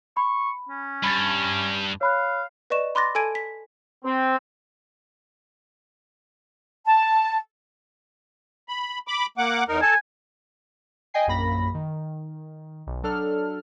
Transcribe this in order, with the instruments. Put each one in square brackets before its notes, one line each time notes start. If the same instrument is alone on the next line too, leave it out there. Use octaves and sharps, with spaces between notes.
[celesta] B5 [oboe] C#6
[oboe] C#4
[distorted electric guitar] G2 [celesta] B5 G#6 A6
[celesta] C#5 B5 F#6 [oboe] F5
[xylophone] B4 D5 D#5 C#6 E7
B5 C6 D6 F#6 A6 A#6
A4 G#5 A5 G#6 D7 D#7
B6
[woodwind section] C4
[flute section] A5
[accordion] B5
B5 D6
A#3 F#5 D6
E2 D#4 A#4
[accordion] A4 A5 [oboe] G#5
[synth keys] D#5 G5 G#5 C7
A#1 F#2 A#3 B5 A#6
D#3
B1
F#3 D4 A4 F6